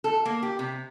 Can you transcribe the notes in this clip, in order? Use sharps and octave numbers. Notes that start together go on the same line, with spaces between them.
A4
A#3
G4
C3